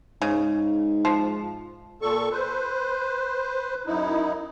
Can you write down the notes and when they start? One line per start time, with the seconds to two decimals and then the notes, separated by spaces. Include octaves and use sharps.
0.22 G#2 C#3
1.05 F3
2.02 A#2 A4 C#6
2.32 B4 C5
3.86 F#2 D#4 E4